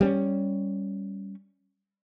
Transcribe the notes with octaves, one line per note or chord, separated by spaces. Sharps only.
G3 C4 C#4